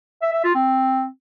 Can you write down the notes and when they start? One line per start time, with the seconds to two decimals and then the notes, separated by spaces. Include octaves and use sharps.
0.22 E5
0.33 E5
0.44 F4
0.55 C4